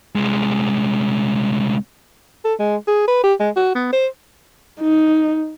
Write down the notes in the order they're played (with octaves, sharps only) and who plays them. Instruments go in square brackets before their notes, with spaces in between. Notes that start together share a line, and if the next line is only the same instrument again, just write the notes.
[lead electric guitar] C2 G#3
[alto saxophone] A4
G#3
G#4
B4
G4
G#3
F#4
B3
C5
[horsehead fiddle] D#4